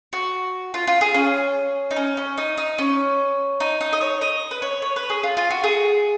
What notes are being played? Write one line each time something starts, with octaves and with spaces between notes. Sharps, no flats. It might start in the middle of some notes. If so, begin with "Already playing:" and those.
F#4
F4
F4
G#4
C#4
D#4
C#4
C#4
D#4
D#4
C#4
D#4
D#4
D#5
C#5
D#5
B4
C#5
C#5
B4
G#4
F4
F4
F#4
G#4